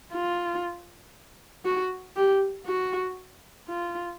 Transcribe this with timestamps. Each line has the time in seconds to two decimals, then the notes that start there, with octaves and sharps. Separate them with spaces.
0.13 F4
1.65 F#4
2.16 G4
2.66 F#4
3.69 F4